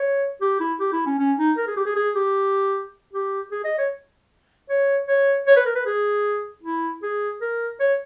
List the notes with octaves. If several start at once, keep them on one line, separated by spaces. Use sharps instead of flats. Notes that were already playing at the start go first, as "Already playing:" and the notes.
Already playing: C#5
G4
E4
G4
E4
C#4
C#4
D#4
A#4
G#4
G4
G#4
G#4
G4
G4
G#4
D#5
C#5
C#5
C#5
C#5
B4
A#4
B4
G#4
E4
G#4
A#4
C#5